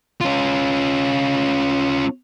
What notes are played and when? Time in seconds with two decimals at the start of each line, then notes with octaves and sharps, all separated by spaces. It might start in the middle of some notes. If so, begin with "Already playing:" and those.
0.21 C#4 F4